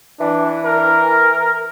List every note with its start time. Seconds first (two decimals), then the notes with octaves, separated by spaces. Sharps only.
0.20 E3 D4
0.65 A#4